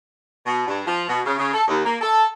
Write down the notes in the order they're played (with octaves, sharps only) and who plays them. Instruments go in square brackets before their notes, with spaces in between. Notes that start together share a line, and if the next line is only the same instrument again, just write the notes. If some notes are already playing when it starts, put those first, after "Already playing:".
[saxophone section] B2
G2
F3
B2
C#3
C#3
A4
D#2
A#3
A4